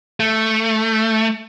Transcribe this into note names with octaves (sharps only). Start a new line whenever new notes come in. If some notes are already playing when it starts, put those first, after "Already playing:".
A3